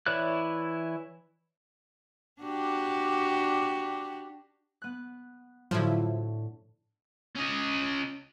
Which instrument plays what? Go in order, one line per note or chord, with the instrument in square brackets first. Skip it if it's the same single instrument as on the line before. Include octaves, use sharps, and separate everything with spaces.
[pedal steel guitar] E3 E4 C#5 D5 F#6
[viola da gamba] D4 F#4 G4
[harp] B3 F#6
[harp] A2 D3 [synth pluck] F3 F#3 E4
[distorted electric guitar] C#4 D#5